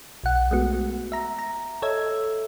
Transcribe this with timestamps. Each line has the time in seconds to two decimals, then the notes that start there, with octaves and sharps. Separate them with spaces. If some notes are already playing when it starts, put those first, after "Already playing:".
0.24 B1 F#5
0.51 G#3 A3 B3 F#4
1.12 E5 A#5
1.39 A#5
1.82 A4 C#5 D#5 E5 E6 G#6